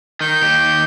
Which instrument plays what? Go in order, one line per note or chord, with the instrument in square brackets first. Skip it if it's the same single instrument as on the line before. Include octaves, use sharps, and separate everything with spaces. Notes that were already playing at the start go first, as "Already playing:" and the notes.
[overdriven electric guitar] D#3 [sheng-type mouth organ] G6
[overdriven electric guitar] D#2 G4